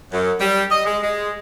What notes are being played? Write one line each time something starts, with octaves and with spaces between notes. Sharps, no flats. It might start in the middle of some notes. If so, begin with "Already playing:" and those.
F#2
G3
D#5
G#3
G#3